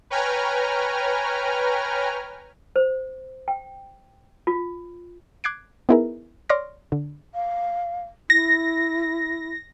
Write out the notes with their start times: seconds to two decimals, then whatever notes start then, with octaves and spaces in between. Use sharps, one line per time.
0.10 B4 C#5 G5 G#5 A#5 F6
2.76 C5
3.48 G5
4.47 F4
5.44 D6 F#6 G#6 C7 D7
5.89 B3 D#4 E4 G#4 A#4
6.49 C#5 D5 C6 D6 F6 A#6
6.92 D3
7.33 F5
8.30 E4 A#6